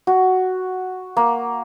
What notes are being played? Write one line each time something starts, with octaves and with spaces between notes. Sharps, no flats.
F#4
A#3